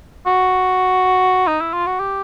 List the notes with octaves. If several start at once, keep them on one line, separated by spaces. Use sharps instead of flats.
F#4
D#4
E4
F4
F#4
G4